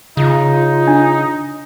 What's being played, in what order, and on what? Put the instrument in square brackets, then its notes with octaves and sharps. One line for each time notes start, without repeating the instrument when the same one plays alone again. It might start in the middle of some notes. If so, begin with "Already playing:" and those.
[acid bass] C#3 [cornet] D#4 [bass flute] F4
[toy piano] D4